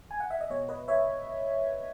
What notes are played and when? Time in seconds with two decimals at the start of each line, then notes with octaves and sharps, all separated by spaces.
0.11 G#5
0.20 F#5
0.30 E5
0.41 D#5
0.50 B2 C#5
0.69 B4 D#5
0.88 C#5 E5